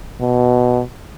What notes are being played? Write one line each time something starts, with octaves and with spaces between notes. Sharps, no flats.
B2